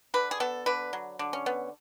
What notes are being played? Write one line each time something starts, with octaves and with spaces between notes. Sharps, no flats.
D3 B4
G#4
B3 A4
D3 B4
F#3
D3
C#4
B3